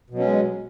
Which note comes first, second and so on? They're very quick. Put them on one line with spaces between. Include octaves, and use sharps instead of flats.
B2 F#3 C#4 G#3